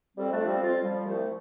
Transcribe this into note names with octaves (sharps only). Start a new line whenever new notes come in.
F2 G3 C4
A3 D4
F3
G3 C4
F2 C4 F4
F3 G3
C2 F3 A3